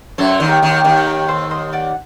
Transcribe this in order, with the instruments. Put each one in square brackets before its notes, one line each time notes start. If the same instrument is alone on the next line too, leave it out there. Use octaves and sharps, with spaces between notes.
[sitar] F#2 F#3 [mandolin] A4 C5
[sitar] D#2 D#3
[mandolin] G4 A#4
[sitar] D#2 D#3
[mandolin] C5
G4 A#4
[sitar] D#2 D#3
[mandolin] G4 A#4
A4 C5
C5 D#5
D5 F#5